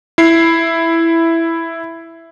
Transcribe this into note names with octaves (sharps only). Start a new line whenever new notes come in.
E4 C7